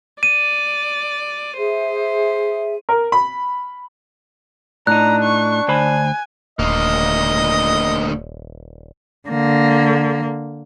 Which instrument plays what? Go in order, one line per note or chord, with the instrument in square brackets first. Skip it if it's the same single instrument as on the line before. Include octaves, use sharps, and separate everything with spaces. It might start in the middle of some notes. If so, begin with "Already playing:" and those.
[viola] D5 [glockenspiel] D#7
[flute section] G#4 E5 [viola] C5
[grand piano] A#4
B5
[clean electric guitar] A2 D#4 [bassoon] D4 [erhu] A#5 [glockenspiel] F#6
[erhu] C#6
[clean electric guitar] D2 C5 B5 [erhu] G#5
[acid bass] D#1 [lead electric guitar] D2 A#3 [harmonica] D#5
[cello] D3 A#3